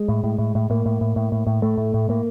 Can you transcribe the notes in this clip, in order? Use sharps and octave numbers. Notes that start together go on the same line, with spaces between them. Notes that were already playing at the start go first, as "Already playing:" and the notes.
Already playing: G#3
A2
A2
A2
A2
A2 A#3
A2
A2
A2
A2
A2
A2 A3
A2
A2
A2 A#3